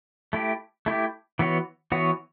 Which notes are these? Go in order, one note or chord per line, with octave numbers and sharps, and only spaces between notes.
A3 E4 G4
A3 E4 G4
E3 B3 F#4 C#5
E3 B3 F#4 C#5